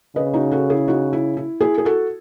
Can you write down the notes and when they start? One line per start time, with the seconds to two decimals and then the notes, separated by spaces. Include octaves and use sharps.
0.16 C#3 B4 D#5
0.33 D#4 F#4
0.52 F#4 A4
0.70 E4 G#4
0.88 D#4 F#4
1.13 E4
1.37 E4
1.61 E4 G#4
1.78 G#4
1.85 F#4 A4